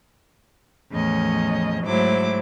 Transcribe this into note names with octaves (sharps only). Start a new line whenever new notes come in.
E2 A2 F3 C#4 D#5
G#2 F#3 A3 E4 C5 D6